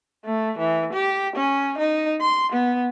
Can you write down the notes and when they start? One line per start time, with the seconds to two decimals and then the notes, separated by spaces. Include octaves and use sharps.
0.25 A3
0.59 E3
0.93 G4
1.36 C#4
1.78 D#4
2.22 C6
2.52 B3